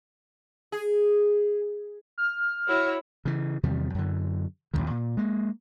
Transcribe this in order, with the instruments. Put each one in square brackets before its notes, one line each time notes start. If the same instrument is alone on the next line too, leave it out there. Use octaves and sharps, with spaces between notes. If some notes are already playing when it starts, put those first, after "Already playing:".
[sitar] G#4
[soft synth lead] F6
[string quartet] E4 F#4 C#5
[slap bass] C#3 E3
E2 C3 D#3 G3
F#2 D3
A1 D#2 A2 D#3
A#2
G#3 A#3